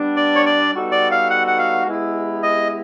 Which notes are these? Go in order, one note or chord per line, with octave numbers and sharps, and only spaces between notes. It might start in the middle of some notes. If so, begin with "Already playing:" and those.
Already playing: G3 B3 D4
D5
C#5
D5
G3 B3 D#4 F#4 A4
D5
F5
F#5
F#5
F5
G#3 B3 E4 G4
D#5